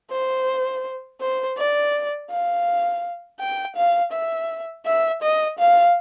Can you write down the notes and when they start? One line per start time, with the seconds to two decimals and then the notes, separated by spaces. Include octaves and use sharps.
0.11 C5
1.20 C5
1.58 D5
2.30 F5
3.40 G5
3.76 F5
4.12 E5
4.86 E5
5.22 D#5
5.59 F5